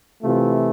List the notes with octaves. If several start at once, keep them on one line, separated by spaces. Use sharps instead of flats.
C3 E3 A3 F4